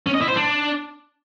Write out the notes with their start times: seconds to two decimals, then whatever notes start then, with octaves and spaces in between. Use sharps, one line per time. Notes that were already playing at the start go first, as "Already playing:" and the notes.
0.06 C#4
0.14 D#5
0.21 E4
0.28 C5
0.36 D4